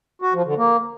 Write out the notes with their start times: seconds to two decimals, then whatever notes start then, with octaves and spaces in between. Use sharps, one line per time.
0.22 F#4
0.34 F3
0.46 D3
0.57 A#3